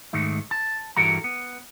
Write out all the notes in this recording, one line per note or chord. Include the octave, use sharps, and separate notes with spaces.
G#2 D#3 A3
A5
G2 E3 F#4 A4 A#4 A#5
B3